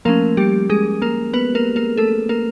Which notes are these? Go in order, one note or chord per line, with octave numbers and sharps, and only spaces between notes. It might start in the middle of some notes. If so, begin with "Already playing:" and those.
F3 A3 A#3 C#4 A#4
G3 G4
G#3 G#4
A#3 A#4
B3 B4
A#3 A#4
A#3 A#4
A3 A4
A#3 A#4